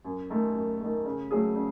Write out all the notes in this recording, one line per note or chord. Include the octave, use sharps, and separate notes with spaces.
F#2
D#3 A3
F#2
D#3 A3
C#3
F#3 A3 C#4 G#4
C#3